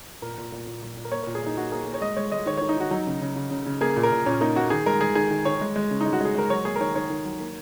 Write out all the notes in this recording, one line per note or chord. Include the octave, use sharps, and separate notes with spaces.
A#2 A#4
A#2
A#2
A#2
A#2
A#2
A#4
A#3 C#5
A#2 A#4
G#4
A#3 D#4
A#3 F#4
A#3 G#4
A#3
C#5
G#3 D#5
G#3 C#5
G#3 D#5
D#3 C#5
D#3 C#5
D#4
D#3 F#4
F#3 D#4
C#3
C#3
C#3
C#3
C#3
A#3 G#4
A#2
A#4
A#2
A#2 C#4
A#3 D#4
A#3 F#4
D#3 G#4
G#3 A#4
G#3 G#4
D#3 G#4
D#3
D#3 C#5
G#3
G#3
C#3
D#4
G#3
F#4
G#3 G#4
G#3 A#4
F#3 C#5
A#3 G#4
A#4
D#3 C#5
D#3 C#5
D#3
F#3
A#3